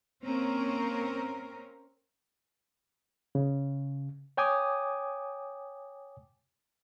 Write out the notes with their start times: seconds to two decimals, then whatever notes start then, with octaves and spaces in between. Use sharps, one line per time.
0.24 A#3 C4 C#4 A#4
3.35 C#3
4.37 C#5 G5 G#5 D6 D#6